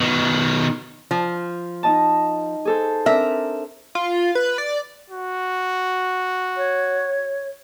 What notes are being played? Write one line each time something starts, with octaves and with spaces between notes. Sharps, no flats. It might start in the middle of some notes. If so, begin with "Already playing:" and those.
B2 D#3
F3
D#4 D#5 A5
G#4 A4 C5
C4 D4 A#4 E5
F4
B4
D5
F#4
C#5